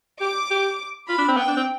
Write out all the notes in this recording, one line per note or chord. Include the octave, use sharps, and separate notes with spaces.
G4 D6
G4
F4 B5
D4
C4
B3 G5
D4
C4